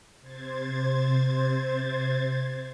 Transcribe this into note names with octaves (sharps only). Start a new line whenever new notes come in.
C3 C5 G#6 A6